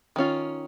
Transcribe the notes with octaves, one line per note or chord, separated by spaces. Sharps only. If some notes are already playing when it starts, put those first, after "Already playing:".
D#3 C#4 F4